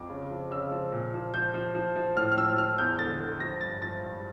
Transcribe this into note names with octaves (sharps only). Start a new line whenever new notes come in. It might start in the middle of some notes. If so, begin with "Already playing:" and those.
Already playing: F2 D6
C#3
F3
C#3 E6
F3
A#2
F3
F3 G6
F3
F3
F3
A2 F6
F6
F3 E6
F3 F6
E2 G6
D3 A6
D3
F3 A#6
G2 A6
F3 A6
G2